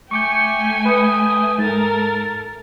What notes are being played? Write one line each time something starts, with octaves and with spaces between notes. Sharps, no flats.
A3 G5 G#5 C#6 D6 G6 C#7
B4 D#6
G#2 A4 A#4 A6